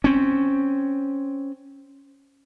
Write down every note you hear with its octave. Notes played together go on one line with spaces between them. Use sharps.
C4 C#4